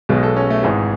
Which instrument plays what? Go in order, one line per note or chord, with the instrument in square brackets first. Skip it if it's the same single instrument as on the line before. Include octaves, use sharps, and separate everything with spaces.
[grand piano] B1 B2 G#3
A4
C#4
A3
G#1 G#2 E3 G#3